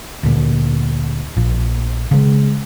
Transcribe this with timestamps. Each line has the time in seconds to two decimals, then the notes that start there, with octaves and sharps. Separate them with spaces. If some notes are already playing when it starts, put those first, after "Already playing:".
0.23 D2 A#2
1.36 A#1 A#2
2.11 C#3 G#3